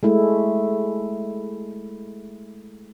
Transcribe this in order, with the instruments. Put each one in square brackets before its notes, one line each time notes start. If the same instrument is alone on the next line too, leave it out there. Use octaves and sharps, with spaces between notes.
[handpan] G#3 A3 E4